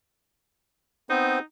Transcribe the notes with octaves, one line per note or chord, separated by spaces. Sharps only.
B3 C4 D#4 C5